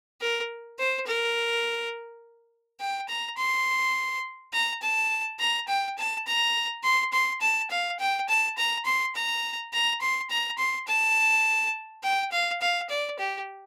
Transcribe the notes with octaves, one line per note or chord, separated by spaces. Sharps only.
A#4
C5
A#4
G5
A#5
C6
A#5
A5
A#5
G5
A5
A#5
C6
C6
A5
F5
G5
A5
A#5
C6
A#5
A#5
C6
A#5
C6
A5
G5
F5
F5
D5
G4